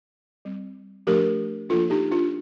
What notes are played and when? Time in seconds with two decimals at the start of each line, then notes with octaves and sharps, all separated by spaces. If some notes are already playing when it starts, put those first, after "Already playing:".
0.45 G3 C4
1.07 F3 A3 D4 G4 A#4
1.69 F3 A#3 D4 F4 A4
1.90 D#4 G4
2.11 D4 F4